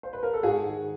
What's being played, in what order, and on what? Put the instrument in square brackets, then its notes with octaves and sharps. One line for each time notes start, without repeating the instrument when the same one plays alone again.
[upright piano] C5
B4
A#4
A4
G#2 F#4 G#4
D#3